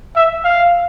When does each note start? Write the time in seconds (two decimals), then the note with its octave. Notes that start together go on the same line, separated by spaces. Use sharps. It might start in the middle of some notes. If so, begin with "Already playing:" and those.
0.16 E5
0.44 F5